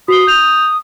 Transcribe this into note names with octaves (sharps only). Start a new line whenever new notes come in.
F#4 D#6 C7 G7
G6 F7